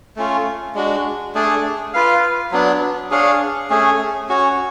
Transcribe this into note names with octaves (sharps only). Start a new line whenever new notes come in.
A3 C#4 F4
G#3 D4 F#4
A3 D4 G#4 D5
F4 B4 F5
F#3 B3 D4
D4 G#4 C#5 F5
A3 C#4 G#4
C#4 F#4 C#5